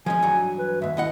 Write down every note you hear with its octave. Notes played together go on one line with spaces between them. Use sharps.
F3 G#3 C#4 G#5
G2 E3 F#3
B4
D#2 G#2 E5
D#2 E4 D#5 F#5